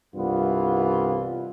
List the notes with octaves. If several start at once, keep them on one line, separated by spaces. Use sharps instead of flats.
C2 G2 B2 E3 B3 F4